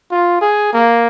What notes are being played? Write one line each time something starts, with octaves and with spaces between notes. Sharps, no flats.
F4
G#4
A#3